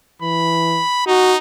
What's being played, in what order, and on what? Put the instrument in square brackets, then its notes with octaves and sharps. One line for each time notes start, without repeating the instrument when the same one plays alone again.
[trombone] E3 [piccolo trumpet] B5
[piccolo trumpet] D#4 [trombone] F#4